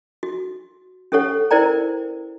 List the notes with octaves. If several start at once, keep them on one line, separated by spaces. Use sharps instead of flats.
F#4
C#4 G4 A4 C#5 F#5
E4 A#4 C5 D5 G5 A#5